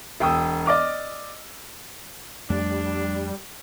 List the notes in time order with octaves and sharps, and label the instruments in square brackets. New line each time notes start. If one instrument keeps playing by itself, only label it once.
[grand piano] E1 G5 D#6 E6
D5 D#5 D6 F6
[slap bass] F2 A3 [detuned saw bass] G3 [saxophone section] D4